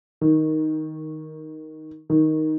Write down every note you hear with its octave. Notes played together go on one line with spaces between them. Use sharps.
D#3
D#3